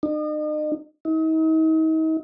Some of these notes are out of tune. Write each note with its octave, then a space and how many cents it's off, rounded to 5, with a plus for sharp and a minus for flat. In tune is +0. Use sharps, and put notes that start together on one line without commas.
D#4 -40
D#4 +40